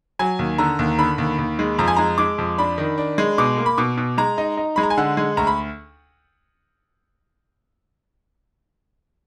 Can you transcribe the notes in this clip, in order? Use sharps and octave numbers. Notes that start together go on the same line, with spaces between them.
F#3 G#5
D#2
D3 A#5
D#2
D3 B5
D#2
D#2
G#3
F2 A#5
G#5
G#3 A#5
G#3 D6
F2
D4 B5
D#3
D4
G#3
B2 D6
A#3
B5
B2 D6
B2
G#3 A#5
D#4
D#4
G#3 B5
A#5
G#5
D3 F#5
G#3
D2 A#5
B5